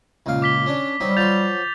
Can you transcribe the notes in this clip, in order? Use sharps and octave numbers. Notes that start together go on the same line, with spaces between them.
C#2 A#2 F5
D6 B6 G7
C#4 D4
F#3 G3 C4 D#4
F3 F#3 C6 G6 A6 F7